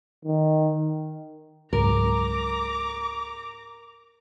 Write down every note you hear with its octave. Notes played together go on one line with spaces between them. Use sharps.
D#3
C#2 G#2 F#3 A#4 A#5 D6